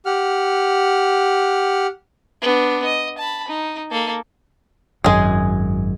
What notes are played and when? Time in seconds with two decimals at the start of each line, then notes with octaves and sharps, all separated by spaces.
0.05 G4 F#5 F6
2.41 B3 D4
2.84 D#5
3.18 A5 B5
3.48 D#4
3.91 A#3 A4
5.04 G#1 F#2 G#3 G#4